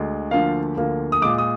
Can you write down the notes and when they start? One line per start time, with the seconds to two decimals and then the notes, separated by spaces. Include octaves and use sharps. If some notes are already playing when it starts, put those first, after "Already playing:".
Already playing: D2 D3 G#3
0.31 D2 D3 F3 A#3 F5
0.77 D2 D3 F3 A#3
1.12 D#6
1.22 G#3 D6
1.25 A#2
1.38 D#6